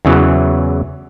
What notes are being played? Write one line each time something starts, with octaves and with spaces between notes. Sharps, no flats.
E2 C#3 E3 F#3